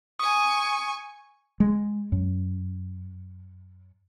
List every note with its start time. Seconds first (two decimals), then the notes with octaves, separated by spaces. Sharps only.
0.19 G#5 C#6 D#6
1.60 G#3
2.12 F#2